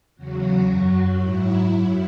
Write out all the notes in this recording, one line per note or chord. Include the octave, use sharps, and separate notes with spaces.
E2 C#3 F#3 F#4
F#2 F#3
G#2 F#3 E4
F#2 F#3